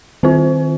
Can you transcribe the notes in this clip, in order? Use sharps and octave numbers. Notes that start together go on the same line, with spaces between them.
D#3 C4 F4 C5